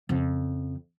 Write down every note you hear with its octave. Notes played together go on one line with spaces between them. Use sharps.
F2 C#3